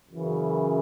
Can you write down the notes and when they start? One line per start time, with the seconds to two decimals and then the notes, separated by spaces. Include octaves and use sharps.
0.11 F#2 C#3 E3